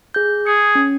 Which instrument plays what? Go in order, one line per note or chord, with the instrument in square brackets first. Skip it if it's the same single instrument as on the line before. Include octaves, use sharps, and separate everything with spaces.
[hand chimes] G#4 G6
[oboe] G#4 [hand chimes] C#7
[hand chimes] C#4